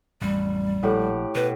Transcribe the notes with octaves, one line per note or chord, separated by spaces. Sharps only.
A1 F2 G3
A#1 A2 G4 F#5
B2 B4